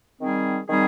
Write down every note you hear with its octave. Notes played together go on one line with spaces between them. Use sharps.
D#3 G3 C4 D#4 G#4
D#3 G3 C4 D#4 G#4